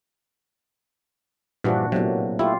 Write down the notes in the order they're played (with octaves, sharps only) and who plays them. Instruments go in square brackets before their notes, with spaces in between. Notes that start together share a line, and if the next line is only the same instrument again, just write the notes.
[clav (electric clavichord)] G2 E3 F3 [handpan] A#2 D4 F#4
[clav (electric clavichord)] A2 C3 [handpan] F#3 A#3 B3
[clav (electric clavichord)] A3 E4 [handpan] F4 G4